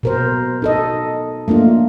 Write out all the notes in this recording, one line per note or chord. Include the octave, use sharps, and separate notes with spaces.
B2 A#4 C5
D#4 A4 D#5
A3 A#3 D4 F4